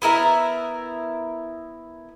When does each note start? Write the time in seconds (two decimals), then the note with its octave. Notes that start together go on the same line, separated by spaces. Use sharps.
0.02 B3 E4 A#4 E5